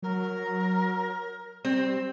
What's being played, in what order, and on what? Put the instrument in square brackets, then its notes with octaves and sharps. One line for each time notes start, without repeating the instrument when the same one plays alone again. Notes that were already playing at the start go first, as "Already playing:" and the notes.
[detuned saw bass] F#3 [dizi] A#4
[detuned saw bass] G3 [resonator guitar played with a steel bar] C4